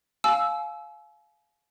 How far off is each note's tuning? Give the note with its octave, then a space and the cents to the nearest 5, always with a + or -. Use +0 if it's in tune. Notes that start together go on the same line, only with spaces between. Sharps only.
F5 +0 G#5 +40 E6 +0